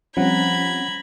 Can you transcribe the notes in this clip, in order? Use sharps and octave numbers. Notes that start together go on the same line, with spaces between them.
F3 G3 C4 C#4 F#5 A#5 B5 G#6